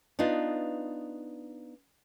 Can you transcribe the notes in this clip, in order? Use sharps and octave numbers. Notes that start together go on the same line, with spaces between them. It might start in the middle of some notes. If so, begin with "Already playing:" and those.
B3 D4 D#4 F4